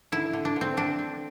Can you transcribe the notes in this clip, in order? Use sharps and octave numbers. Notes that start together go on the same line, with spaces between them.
D3 E4
D3
D4
D3
C4
D3 D4
C4